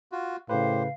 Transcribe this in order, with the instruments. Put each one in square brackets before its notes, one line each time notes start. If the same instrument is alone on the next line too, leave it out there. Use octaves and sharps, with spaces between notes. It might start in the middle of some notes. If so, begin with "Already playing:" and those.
[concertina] F4 F#4
[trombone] A2 [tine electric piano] C#3 B4 [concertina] G4 C5 [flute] F5